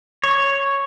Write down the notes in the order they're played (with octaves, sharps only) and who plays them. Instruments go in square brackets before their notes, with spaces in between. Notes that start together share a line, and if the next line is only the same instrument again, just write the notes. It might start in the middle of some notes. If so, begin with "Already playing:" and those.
[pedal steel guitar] C#5